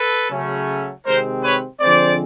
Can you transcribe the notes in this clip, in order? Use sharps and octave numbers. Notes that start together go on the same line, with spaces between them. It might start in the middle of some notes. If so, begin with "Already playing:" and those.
Already playing: A4 B4
C#3 F#3 A3 C#4
C3 D#3 G#3 C4 A#4 C5
B4 C#5
D3 F3 G#3 C4 C5 D5